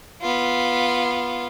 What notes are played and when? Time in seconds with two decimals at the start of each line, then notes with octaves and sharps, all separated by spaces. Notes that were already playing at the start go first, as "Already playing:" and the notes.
0.22 B3 F4